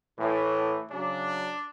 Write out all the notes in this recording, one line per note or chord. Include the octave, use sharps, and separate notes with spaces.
A2 E3
C#3 F#3 D4